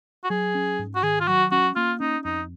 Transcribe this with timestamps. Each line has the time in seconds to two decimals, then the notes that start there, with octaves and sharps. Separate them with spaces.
0.24 F#4
0.30 F#3 G#4
0.55 C#4
0.79 G#2
0.95 F#4
1.03 D#3 G#4
1.20 F4
1.28 F#3 F#4
1.51 C#4 F#4
1.75 A#3 F4
2.00 C#4 D#4
2.25 F2 D#4